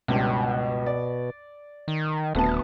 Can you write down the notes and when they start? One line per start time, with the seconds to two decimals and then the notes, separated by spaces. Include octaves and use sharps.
0.08 C#2 G2 B2
0.86 D5
1.88 D#3
2.35 D#1 D2 B3 A5